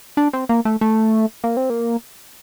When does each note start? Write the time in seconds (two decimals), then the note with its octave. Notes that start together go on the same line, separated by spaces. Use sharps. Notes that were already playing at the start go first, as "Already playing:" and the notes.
0.17 D4
0.33 C4
0.49 A#3
0.65 A3
0.81 A3
1.44 A#3
1.57 C4
1.70 A#3